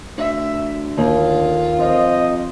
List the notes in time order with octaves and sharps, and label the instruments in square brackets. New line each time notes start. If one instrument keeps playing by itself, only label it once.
[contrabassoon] D2 [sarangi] E5
[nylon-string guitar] D#2 [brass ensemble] D3 [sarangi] F4
[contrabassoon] F2 [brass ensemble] C5 D#5